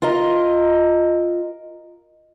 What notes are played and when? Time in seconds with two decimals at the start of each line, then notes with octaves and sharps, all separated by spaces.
0.02 F4 A#4 D#5 A#5